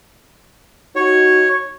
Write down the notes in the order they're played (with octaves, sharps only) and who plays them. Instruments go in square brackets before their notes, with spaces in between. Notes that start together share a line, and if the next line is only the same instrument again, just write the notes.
[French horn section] D#4 F#4 [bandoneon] C#5